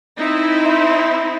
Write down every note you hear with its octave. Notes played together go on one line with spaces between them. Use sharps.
C4 D#4 E4
E5 B5 C6